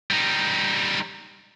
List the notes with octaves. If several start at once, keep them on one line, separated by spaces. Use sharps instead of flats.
G3 D#4